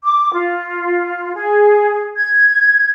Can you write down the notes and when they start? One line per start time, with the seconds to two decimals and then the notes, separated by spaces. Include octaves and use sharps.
0.04 D6
0.33 F4
1.35 G#4
2.17 G#6